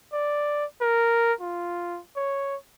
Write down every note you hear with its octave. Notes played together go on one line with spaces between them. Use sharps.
D5
A#4
F4
C#5